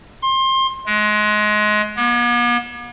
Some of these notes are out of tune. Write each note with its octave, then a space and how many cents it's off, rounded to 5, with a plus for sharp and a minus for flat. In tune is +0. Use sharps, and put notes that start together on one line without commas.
C6 +25
G#3 +25
B3 -45